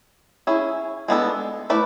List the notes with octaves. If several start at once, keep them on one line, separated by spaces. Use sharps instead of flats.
C#4 E4 G#4
G#3 B3 D4 A4
A3 E4 B4 D5